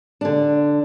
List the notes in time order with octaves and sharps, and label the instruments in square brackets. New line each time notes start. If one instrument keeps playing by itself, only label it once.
[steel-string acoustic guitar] D3 D4